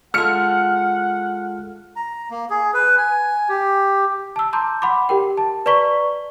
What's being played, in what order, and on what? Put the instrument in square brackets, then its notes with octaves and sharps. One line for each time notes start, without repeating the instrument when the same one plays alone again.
[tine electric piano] G#3 F4 A4 [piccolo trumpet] F#5 [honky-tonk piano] F6 C#7
[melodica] A#5
A#3
G#4
B4
G#5
G4
[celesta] A5 E6
A5 A#5 C6 D6 G6
F#5 B5 C6 D6
G4 A#4 G5
A5
B4 D5 A#5 C#6 B6 G7